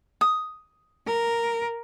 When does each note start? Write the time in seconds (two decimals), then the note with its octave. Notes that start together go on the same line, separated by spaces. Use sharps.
0.21 D#6
1.07 A#4